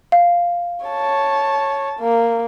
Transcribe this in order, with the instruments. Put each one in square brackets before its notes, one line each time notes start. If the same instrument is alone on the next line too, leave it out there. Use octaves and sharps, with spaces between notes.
[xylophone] F5
[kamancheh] C#5 A5
A#3